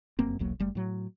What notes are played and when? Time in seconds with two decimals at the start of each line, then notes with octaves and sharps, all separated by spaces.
0.19 F1 F#2 A#3 C4
0.39 E1 B1 F#3 A#3
0.60 F#1 G3 A3
0.75 A2 F#3